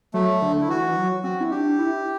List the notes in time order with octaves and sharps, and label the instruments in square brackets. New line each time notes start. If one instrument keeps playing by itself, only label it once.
[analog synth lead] F#3 [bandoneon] A3
[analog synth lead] D3
[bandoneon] E4
[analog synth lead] E3 [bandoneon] F#4
[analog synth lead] E3
F#3
[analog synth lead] C4 [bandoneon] F#4
[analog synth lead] E4
[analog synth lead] D4 [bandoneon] G4
[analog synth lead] E4